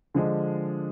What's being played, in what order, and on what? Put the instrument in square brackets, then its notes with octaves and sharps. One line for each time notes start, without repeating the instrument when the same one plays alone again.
[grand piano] D3 F3 G#3 D4